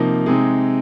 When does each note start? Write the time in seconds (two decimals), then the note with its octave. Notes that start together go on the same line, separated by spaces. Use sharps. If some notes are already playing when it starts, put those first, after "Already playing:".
Already playing: C3 F3 A#3 D#4
0.26 C3 G#3 C4 D#4 G#4